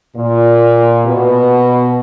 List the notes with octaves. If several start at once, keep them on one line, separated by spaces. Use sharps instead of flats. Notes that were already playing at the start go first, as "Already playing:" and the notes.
A#2
B2